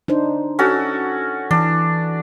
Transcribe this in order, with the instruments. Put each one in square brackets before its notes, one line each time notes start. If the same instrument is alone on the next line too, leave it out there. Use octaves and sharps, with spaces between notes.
[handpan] D4 D#4 C5
[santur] C#4 F#4 A4
[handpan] E3 [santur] D4